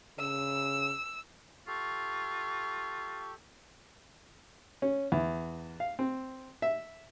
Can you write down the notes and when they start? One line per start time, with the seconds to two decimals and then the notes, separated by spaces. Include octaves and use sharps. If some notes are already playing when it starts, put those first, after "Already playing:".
0.18 C#3 E6
1.67 F4 G4 A4 C#6
4.82 C#4
5.12 E2
5.80 F5
5.99 C4
6.62 E5